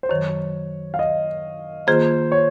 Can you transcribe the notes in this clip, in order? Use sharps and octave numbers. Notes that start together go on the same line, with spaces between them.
C5
F#2 D#3 F#3 C#5
F5
D#5
D#3 A#3 F4 G#4 C5
C#5